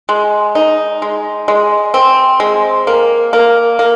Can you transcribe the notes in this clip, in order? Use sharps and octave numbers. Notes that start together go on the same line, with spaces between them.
G#3
D#4
G#3
G#3
C4
G#3
A#3
A#3
A#3